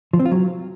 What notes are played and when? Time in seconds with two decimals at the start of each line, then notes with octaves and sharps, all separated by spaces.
0.13 F3
0.20 C4
0.26 F4
0.32 F#3